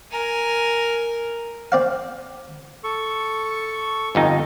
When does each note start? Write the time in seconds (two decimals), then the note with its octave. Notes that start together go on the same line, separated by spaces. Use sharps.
0.11 A#4 G#5
1.72 C4 D5 F5
2.84 A4 C#6
4.15 G1 F2 D#4